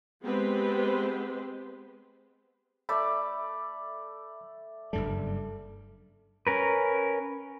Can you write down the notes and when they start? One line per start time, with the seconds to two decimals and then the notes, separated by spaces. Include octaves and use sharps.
0.22 G#3 B3 C4 G4 B4 C5
2.89 A3 D5 E5 B5
4.93 F#1 G2 G3 A4
6.47 C#4 A#4 B4